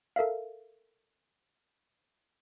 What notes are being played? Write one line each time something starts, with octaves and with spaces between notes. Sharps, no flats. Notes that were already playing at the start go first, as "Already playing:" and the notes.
A4 A#4 E5 F5